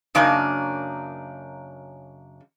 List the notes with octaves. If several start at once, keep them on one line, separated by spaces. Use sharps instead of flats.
F#2 C#3 A#3 D4 D#4